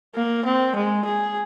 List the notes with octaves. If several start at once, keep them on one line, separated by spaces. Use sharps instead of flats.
A#3
C4
G#3
G#4